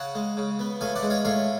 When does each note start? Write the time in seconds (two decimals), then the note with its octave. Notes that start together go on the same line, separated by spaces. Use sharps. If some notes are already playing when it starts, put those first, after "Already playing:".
Already playing: C#3 F#5 A5
0.15 G#3
0.37 C#3
0.59 B3
0.81 A2 F5 G#5
0.95 D5 F#5
1.03 G#3
1.10 C#5 F5
1.25 A2 C#5 F5